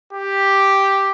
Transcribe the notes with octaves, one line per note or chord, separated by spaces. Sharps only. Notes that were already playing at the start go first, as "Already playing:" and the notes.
G4